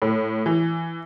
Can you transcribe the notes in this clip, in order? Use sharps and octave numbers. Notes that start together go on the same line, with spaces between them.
A2
E3